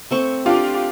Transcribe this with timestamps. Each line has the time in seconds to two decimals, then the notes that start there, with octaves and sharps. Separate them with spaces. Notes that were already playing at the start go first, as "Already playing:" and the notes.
0.11 A3 C4 C#6
0.46 D4 F4 G4